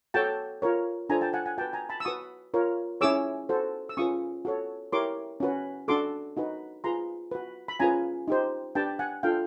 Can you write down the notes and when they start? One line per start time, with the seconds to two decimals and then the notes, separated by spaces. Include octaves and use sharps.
0.14 F#4 A4 C#5 G5 A5
0.62 F4 A#4 C#5
1.09 D4 F4 A4 C5 G#5 A#5
1.21 G5 A5
1.33 F#5 G#5
1.46 F#5 G#5
1.58 F#4 B4 G5 A5
1.73 G#5 A#5
1.89 A5 B5
2.00 E6
2.05 F#4 B4 C#6 D#6
2.54 F4 A#4 C#5
3.01 C#4 E4 G#4 C#5 D6 E6
3.49 F#4 A4 C5
3.89 E6
3.97 C#4 F4 G#4 B4 C#6 D#6
4.45 F#4 A4 C#5
4.92 E4 G4 A#4 C#5 C6 D6
5.40 C#4 F#4 B4
5.88 D4 F#4 A4 C6 D6
6.37 D#4 F#4 B4
6.84 F4 G#4 B4 A#5 C6
7.32 F#4 B4
7.68 B5
7.80 C#4 F4 G#4 B4 G#5 A#5
8.28 D#4 G4 C5
8.75 D4 G4 B4 G5 A5
8.99 F#5 G#5
9.23 D4 F4 A4 F5 G5